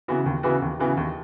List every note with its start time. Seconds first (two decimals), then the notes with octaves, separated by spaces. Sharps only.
0.08 C#3 E3 B3 F#4
0.26 D#2
0.43 C#3 E3 B3 F#4
0.62 D#2
0.80 C#3 E3 B3 F#4
0.97 D#2